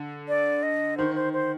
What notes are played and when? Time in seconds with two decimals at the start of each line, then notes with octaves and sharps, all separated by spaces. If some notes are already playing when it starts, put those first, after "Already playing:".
Already playing: D3
0.28 D5
0.63 D#5
0.97 D#3 C5
1.15 C5
1.33 C5